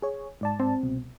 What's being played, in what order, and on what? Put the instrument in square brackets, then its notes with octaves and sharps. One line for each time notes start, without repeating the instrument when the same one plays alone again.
[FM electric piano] G#4 C#5
G#2 D5 A5
[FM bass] C4
[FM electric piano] C2 B2